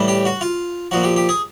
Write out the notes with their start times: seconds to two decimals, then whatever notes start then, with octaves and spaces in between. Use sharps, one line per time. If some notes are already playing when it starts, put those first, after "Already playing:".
Already playing: A2 E3 G3
0.08 G4
0.25 F#4
0.41 F4
0.91 A#2 F3 F#4
1.04 G4
1.16 G4
1.29 G#4